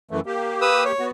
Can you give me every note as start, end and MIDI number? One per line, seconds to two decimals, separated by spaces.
0.11 0.20 42
0.11 0.20 52
0.11 0.20 57
0.26 0.92 58
0.26 0.92 67
0.61 0.84 71
0.61 0.84 87
0.61 0.84 88
0.85 1.06 73
0.99 1.11 59
0.99 1.11 66